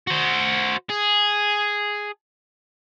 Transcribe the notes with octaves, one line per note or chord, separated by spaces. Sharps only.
F#4 C5
G#4